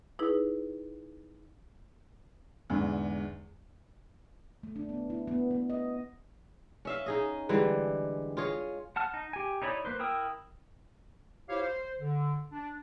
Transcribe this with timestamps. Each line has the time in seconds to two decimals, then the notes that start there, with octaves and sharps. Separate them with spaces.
0.19 D#4 E4 G#4 B4
2.70 E2 G#2 D3
4.63 A3
4.76 D4
4.89 B3
5.10 E4
5.28 B3
5.51 B3
5.70 D#5
6.85 C#4 E5 F5
7.06 D#4 G#4 D#5
7.49 D3 E3 G3 G#3
8.37 F4 G#4 C#5 D#5
8.96 F#5 A5 F6
9.14 D#4
9.33 G4 G#5
9.62 D#4 E4 C#5 D5 B5
9.85 A#3 B4 C5
9.99 E4 A#4 G5 D#6 E6
11.49 E4 F4 G4 C5 C#5 F5
11.63 C5
12.00 D3
12.51 D4